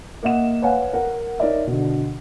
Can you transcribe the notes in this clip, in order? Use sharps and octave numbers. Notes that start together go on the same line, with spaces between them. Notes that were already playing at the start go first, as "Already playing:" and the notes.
A#3 D#5 E5 F#5 E7
B4 C#5 F5 F#5 G#5
A#4 F#5
D#4 A#4 C#5 D5 E5
B2 D3